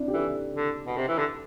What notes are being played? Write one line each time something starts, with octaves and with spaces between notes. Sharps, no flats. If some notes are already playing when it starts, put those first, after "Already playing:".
Already playing: C4 D4 E4
G4
E3 A4
D3
B2
C3
E3
D3